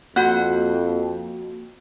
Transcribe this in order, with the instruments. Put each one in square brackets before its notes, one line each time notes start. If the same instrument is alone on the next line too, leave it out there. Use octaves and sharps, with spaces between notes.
[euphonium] F2 [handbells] A#3 F#4 G6 [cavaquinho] C5 F#5